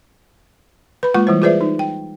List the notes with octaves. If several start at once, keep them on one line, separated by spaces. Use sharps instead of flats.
B4 B5
G#3 A#3 F4 F#5 C#6
E3 G3 E4 C5
F4 G#4 B4 C5 D5 E5
D#4
G5